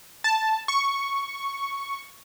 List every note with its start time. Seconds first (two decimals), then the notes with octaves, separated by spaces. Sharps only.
0.24 A5
0.68 C#6